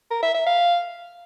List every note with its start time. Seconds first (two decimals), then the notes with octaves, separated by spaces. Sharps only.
0.11 A#4
0.23 E5
0.35 E5
0.46 F5